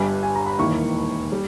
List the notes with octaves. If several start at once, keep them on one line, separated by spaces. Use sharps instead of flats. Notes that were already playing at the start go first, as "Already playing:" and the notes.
Already playing: G1 G2 G3 G#5
G#5
A#5
B5
E1 D#2 D#3 A#3 E4 C#6
G3